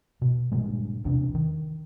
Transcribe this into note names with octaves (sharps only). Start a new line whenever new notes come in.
B2
G2 A#2 D3 G#3
B1 E2 C3 D4
D#3